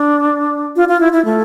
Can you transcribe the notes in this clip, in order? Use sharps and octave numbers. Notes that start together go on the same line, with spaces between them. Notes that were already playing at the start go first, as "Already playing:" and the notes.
Already playing: D4
F4
F4
E4
E4
A3